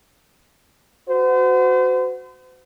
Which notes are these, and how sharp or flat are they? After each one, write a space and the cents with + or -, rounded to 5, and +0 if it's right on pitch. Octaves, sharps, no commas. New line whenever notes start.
F#4 +0 C5 -40